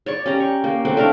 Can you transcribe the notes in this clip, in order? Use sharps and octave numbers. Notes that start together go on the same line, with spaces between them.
C#5 D5 C#6
C#4 G4 A#5
C#6
A#3
A3 C4 F#5 G5
A3 D4 A#4 F5